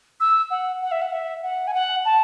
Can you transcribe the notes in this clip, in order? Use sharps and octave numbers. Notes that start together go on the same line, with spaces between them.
E6
F#5
F#5
E5
F#5
E5
F#5
G#5
F#5
A5